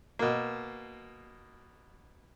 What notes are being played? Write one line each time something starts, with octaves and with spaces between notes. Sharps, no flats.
B2 A#3